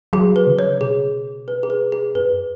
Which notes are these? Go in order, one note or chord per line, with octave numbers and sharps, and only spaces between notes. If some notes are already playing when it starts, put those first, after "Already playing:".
F#3 G#4
B4
C#3
C#5
B2 G#4
B4
G#4
B4
G#4
F#2 B4